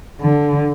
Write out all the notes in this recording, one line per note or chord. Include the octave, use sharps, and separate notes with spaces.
D3